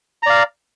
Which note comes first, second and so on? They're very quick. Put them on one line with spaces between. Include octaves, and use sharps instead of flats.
A#5 D5 F5